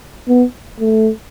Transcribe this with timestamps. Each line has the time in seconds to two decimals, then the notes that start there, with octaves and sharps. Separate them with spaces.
0.28 B3
0.80 A3